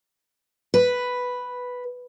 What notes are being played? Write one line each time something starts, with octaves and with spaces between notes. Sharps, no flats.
B4